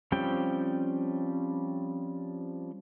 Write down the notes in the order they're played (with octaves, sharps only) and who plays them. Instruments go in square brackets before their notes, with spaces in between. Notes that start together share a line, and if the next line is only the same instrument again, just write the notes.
[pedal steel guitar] F3 G3 C4 C#4 G5